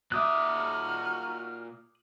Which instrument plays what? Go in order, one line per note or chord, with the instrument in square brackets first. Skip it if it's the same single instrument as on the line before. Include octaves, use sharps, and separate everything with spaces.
[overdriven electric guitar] A#2 E5 [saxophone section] D#4 F#4 [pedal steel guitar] D6 D#6 F#6 [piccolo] F6